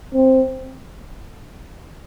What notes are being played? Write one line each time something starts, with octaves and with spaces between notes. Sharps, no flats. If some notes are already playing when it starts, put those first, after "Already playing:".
C4